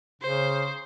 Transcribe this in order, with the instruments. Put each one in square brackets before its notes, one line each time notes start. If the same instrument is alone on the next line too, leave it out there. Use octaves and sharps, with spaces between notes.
[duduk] C#3 [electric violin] C5